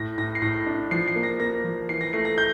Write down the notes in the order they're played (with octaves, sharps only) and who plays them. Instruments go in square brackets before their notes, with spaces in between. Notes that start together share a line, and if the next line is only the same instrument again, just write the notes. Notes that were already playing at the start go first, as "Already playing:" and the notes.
Already playing: [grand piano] A2 A#6
A2 A#6
C7
A2 A#6
D4
F3 C7
C7
A#3
A#6
A#3 A#6
F3
E3 C7
A#6
A3 C7
A#6
G6